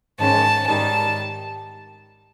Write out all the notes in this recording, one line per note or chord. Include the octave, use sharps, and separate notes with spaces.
G#2 D#3 G#3 C#4 A5
G#2 D#3 G3 A5